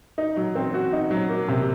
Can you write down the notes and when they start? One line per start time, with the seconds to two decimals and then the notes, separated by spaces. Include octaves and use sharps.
0.18 D#4
0.37 F#3
0.55 C4
0.74 F#4
0.93 D#4
1.11 F#3
1.29 A#3
1.48 C3